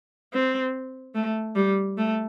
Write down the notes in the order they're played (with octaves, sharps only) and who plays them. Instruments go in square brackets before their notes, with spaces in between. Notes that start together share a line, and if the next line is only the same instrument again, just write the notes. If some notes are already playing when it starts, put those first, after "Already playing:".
[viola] C4
A3
G3
A3